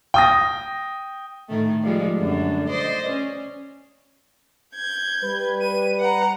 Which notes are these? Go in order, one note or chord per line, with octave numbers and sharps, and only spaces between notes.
G5 D#6 A#6
A2 D#3 A3
F3 G3 G#3
F#2 D3 D4
C5 D5 D#5
C#4
G6 G#6
G3 B4
D#7
F#5 A#5